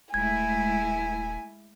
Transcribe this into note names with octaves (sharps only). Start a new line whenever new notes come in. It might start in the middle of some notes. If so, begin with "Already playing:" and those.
D#1 G#3 A3 E4 G#5 G#6